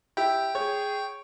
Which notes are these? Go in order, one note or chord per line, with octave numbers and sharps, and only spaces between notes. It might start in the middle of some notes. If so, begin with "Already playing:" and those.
E4 G4 G5
G#4 C#5